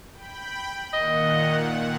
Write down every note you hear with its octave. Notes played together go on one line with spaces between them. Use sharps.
G5 B5
A#2 D#3 D#5 F#5